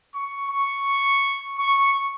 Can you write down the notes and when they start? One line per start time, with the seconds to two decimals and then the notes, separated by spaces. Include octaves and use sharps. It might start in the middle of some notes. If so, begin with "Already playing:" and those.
0.15 C#6
0.51 C#6
1.59 C#6